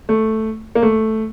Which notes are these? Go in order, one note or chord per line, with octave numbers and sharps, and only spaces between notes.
A3
A#3
A3